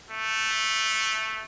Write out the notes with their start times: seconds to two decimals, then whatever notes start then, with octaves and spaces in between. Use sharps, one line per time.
0.11 A3